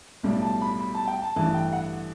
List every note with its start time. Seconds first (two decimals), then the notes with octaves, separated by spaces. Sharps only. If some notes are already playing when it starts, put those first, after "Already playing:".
0.23 B1 A2 G3
0.42 A5
0.61 B5
0.80 B5
0.94 A5
1.07 G5
1.22 A5
1.36 A1 G2 E3 A3 A5
1.54 G5
1.73 F#5